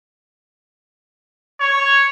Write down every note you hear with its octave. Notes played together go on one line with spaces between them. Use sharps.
C#5